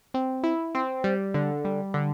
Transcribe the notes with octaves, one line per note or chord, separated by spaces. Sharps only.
C4
E4
C4
G3
D3
G3
D3